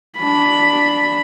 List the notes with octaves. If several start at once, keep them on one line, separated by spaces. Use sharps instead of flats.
D4 B5